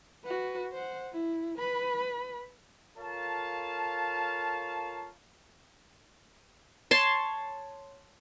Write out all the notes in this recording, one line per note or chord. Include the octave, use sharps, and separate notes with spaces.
F#4 B4
C5 F#5
E4
B4 B5
F4 A4 A#4 C#5 F5 A5
C#5 A5 C6